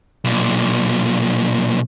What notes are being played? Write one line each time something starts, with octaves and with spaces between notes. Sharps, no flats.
B1 A#2